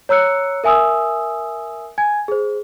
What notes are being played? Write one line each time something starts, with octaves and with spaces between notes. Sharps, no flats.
C#5 A#5 E6 F#6 C#7
A#4 E5 G#5 D#6 E6
G#5 G#6
G#4 C5